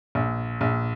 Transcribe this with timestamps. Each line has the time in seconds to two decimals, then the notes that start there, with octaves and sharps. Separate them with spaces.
0.15 A#1
0.61 A#1